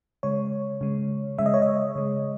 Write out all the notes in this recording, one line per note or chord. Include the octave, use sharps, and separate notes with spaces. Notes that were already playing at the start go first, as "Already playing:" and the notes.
C#3 G#3 C#5
C#3 G#3
C#3 G#3 E5
D#5
C#5
D#5
C#3 G#3